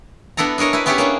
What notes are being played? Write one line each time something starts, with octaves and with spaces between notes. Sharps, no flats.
B3 D4 E4 A4 A#5
D4 G#4 A#4 C#5 D#5
E4 B4
B3 C#4 E4 G4 G#4 C#5
A#3 C#4 D4